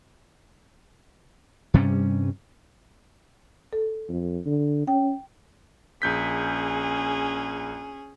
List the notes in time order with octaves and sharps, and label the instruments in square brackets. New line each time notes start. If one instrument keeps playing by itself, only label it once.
[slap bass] G2 C3 G3 C#4
[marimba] A4
[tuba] F2
D3
[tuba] C#4 [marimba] G5
[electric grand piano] A#1 G6 B6 [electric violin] C#4 G#4